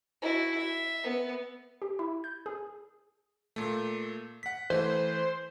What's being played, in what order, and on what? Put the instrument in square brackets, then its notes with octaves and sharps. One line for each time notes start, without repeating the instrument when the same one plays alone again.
[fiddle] E4 F#4
E5
B3
[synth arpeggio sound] G4
E4
G6
G#4
[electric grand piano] A#2 A3
F#5 B6
[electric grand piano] E3 A3 [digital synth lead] C5